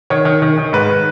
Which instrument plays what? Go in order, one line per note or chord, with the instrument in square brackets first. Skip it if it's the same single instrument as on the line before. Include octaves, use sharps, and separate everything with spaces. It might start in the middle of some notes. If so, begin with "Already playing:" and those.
[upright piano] D#3 C#5
D#3
D#3
D#3
G#2 B4